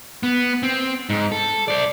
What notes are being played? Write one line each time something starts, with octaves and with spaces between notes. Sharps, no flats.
B3
C4
G#2
A4
C5 D5